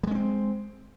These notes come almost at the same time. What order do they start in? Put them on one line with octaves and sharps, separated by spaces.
G3 G#3 C#4 C4